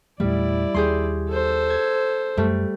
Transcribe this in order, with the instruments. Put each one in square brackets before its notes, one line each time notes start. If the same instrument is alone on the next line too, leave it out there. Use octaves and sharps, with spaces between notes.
[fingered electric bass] E2 A#2 A3 [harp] G3 [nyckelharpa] E4 D5
[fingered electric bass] D#2 G3 [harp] G4 G#4 C6
[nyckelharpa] A4 C5
[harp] G#6
[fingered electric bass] F#2 [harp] G3 A3